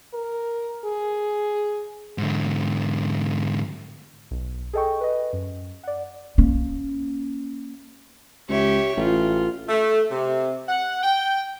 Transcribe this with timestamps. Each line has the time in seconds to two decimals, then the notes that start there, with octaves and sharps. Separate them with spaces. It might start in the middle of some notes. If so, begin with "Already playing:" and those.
0.14 A#4
0.85 G#4
2.18 G#2 D3
4.31 B1
4.73 G#4 A4 D#5 G5 C#6
5.01 B4 D#5
5.33 F#2
5.83 D5 F#5
6.38 A#3 C#4
8.49 C#2 G4 C#5 E5
8.97 A1 F4
9.69 A3
10.12 C3
10.68 F#5
11.03 G5